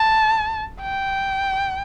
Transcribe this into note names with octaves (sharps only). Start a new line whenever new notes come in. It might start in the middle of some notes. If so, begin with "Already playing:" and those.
Already playing: A5
G5